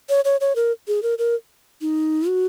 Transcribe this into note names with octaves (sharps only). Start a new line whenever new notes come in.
C#5
C#5
C#5
A#4
G#4
A#4
A#4
D#4
F#4